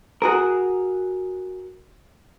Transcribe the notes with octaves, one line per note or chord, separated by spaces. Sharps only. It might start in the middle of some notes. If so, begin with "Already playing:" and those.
F#4 G#4 A#4